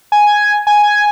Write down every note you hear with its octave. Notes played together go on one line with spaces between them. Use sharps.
G#5
G#5